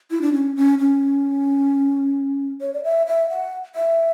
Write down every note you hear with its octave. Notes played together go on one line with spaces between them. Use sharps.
E4
D4
C#4
C#4
C#4
C#5
D5
E5
E5
F#5
E5